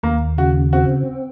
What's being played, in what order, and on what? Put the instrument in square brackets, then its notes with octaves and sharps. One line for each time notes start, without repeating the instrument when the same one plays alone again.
[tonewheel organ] D#2 [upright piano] A#3
[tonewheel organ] C#3 [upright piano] F#4
[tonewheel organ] C4 [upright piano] F#4